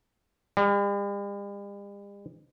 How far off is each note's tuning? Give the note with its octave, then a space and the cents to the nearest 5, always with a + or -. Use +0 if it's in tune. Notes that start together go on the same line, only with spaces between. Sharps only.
G3 +45